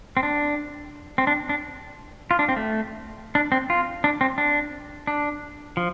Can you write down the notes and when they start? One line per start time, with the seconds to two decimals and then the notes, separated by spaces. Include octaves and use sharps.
0.17 C4
0.23 D4
1.18 C4
1.27 D4
1.49 D4
2.31 F4
2.39 D4
2.49 C4
2.56 A3
3.35 D4
3.52 C4
3.70 F4
4.04 D4
4.21 C4
4.38 D4
5.07 D4
5.77 F3